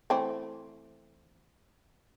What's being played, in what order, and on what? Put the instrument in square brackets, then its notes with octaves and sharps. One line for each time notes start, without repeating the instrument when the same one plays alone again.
[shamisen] E3 A3 C4